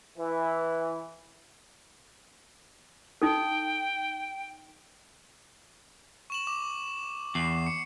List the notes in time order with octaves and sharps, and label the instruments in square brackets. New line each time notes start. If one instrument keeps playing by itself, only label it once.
[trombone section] E3
[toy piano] D#4 A4 [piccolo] G5
[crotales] C#6 E7 F#7
D6
[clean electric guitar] E2 [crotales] C7
[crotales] C#7